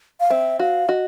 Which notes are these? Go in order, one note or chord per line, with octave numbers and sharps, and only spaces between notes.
F5
C4 E5
F#4 F5
F#4 D#5